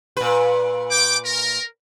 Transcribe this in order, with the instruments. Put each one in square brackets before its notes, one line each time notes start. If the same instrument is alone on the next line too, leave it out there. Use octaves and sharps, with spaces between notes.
[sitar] A#2 B4
[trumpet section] G5 D6
A#4